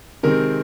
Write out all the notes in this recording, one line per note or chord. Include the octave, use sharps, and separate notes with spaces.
C3 D#3 G#3 C4 A#4